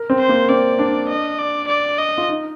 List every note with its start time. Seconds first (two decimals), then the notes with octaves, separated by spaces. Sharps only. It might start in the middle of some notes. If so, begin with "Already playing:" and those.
Already playing: A#4
0.10 C4
0.19 C5
0.29 A#3
0.49 C4 D5
0.79 D4
1.09 D#5
1.39 D5
1.68 D5
1.98 D#5
2.18 F4
2.29 D#4